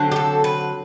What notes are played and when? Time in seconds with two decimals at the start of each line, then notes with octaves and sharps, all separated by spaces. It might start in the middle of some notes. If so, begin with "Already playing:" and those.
Already playing: D3 F#3 C4
0.12 G4
0.16 A4
0.44 B4